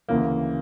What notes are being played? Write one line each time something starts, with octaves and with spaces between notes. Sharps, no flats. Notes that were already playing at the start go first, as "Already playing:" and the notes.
D2 C#3 E3 A#3